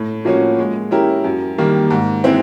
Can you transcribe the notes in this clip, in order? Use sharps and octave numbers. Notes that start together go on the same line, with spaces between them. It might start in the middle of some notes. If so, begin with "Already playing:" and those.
Already playing: A2
F3 A#3 C#4 F#4
G#3
C#4 E4 G4 A#4
F#2
D#3 G3 A#3
G#2
E3 G#3 C4 E4